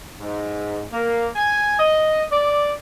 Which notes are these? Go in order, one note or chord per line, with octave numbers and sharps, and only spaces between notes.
G#2
A#3
G#5
D#5
D5